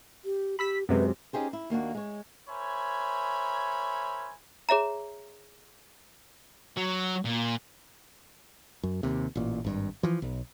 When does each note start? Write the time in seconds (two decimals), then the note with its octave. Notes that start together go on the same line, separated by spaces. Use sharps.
0.25 G4
0.59 G4 B5 E6 B6
0.89 F#2 C3 G#3 B4
1.33 C#4 D#4 G4 G#4 C5
1.53 E4
1.70 D#2 A#3 D4 F#4
1.95 G#3 C#5
2.49 A#4 C5 C#5 E5 G#5 B5
4.69 G#4 C#5 E5 A#5
6.77 F#3
7.25 A#2
8.83 F#2
9.03 D#2 C3
9.35 A1 A#2
9.65 G#1 G2
10.03 E3 F3
10.22 B1